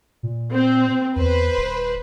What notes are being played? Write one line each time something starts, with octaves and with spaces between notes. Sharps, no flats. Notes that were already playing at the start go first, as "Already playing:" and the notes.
A#2
C4
E2 B4 C5
D#1